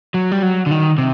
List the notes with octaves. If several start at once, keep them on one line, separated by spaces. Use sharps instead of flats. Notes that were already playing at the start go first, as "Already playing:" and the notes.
F#3
G3
F#3
D3
D#3
C3